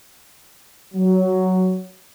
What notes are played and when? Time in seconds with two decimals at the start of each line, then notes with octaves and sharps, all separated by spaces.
0.94 F#3